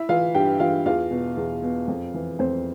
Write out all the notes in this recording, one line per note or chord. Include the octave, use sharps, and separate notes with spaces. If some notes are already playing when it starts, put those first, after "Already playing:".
Already playing: E4 E5
E3 F4 F5
G2 G4 G5
E3 F4 F5
E2 F4 F5
B2
E2
B2
F2
E3
F2 C4 C5